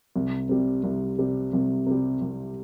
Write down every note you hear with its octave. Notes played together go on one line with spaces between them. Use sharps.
C2
C3 G3
C2
C3 G3
C2
C3 G3
C2